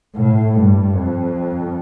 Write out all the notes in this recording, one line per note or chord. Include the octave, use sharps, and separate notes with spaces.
A2
G2
F2